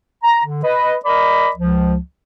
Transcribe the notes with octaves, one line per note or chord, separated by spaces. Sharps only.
A#5
D3
B4 D#5
A#4 D5 D#5 B5
C#2 F3